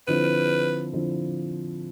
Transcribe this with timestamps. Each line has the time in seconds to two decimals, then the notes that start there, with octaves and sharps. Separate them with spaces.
0.08 D3 F3 C4 E4 B4
0.93 D3 F3 C4 E4